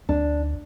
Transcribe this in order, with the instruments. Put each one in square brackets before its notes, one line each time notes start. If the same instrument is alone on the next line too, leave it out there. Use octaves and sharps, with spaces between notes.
[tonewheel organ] D2 [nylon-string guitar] D4